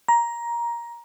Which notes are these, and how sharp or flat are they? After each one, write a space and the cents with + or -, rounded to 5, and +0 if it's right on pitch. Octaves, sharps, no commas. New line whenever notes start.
A#5 +15